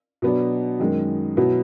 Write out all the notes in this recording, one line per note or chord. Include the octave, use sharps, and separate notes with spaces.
B2 F#3 B3 D4
F#2 D#3 G#3
B2 F#3 B3 E4